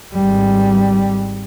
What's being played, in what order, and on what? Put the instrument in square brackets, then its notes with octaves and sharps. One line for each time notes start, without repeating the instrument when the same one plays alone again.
[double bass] G#1 G3